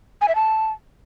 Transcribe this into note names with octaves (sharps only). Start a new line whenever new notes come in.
G#5
E5
A5